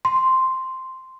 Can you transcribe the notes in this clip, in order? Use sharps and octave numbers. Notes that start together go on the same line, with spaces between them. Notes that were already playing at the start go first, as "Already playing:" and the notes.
C6